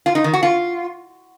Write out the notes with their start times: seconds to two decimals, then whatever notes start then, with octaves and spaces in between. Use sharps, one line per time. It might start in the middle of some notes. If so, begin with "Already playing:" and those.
0.06 F4
0.15 D#4
0.24 D#3
0.33 F#4
0.43 F4